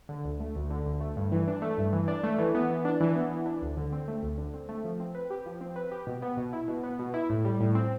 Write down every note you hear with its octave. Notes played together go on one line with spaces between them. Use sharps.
D3
D2
A3
D2
D3
D2
A3
G2
E3
D4
A3
G2
E3
D4
A3
E3
B3
E3
D4
E3
B3
E3
D4
D2
D3
C4
A3
D2
D3
C4
A3
F3
C4
B4
G4
F3
C4
B4
G4
B2
B3
B2
E4
B2
B3
B2
E4
A2
G3
A2
C4